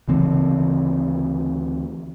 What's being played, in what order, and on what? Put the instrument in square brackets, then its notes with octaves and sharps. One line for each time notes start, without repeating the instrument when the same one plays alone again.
[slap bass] D2 C#3 E3 C4